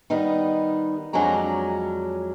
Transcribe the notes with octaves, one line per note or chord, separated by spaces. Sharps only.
D#3 G3 B3 D#4
F2 F#3 G#3 C#4 D4 A#5